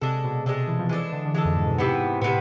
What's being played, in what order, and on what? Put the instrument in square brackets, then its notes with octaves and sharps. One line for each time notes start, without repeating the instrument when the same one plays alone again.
[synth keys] C3 [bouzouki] G#3 D4 A4
[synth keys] B2
[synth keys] C3 [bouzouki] G#3 D4 A4
[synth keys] E3
F3
[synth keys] E3 [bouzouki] G#3 D4 A4
[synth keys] D3
D3
[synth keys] E3 [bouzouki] G#3 D4 A4
[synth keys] F2
G#2
B2
[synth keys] G#2 [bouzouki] C3 E3 B3
[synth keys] G#2
[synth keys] A2 [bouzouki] C3 E3 B3